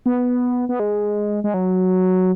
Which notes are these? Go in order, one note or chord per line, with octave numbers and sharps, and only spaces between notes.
B3
B3
G#3
G#3
F#3